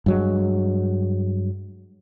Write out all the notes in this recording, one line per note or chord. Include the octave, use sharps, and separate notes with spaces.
G2 F#3 G#3